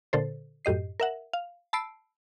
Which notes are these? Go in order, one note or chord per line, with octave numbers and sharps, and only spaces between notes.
A#2 D3 A4 C5
F#2 A2 G4 D#5 C7
A#4 E5 F#5
F5
A5 B5 E6 C7 D7